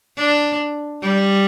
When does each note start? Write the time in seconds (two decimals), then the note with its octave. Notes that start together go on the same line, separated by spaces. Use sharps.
0.17 D4
1.02 G3